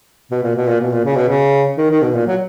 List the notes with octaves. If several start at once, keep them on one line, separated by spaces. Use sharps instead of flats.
B2
A#2
B2
A#2
B2
A#2
C#3
B2
C#3
D#3
D#3
B2
A#2
F#3